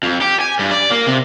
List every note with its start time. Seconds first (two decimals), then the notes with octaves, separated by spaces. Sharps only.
0.03 F2
0.21 G4
0.41 G#5
0.59 G2
0.71 D5
0.91 A#3
1.07 C3